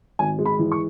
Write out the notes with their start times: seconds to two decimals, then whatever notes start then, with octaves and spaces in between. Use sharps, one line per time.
0.19 G#1 G#5
0.39 G#3
0.46 B5
0.59 E3
0.72 C#6